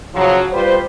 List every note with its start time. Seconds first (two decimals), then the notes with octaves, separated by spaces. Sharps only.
0.14 C#3 F3 F#3
0.53 G3 F4 B4 C5